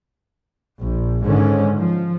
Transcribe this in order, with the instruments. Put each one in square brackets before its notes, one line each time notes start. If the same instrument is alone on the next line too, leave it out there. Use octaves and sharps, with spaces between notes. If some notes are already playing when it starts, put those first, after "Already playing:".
[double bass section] A#1
G#2 D3 D#3 C#4
F3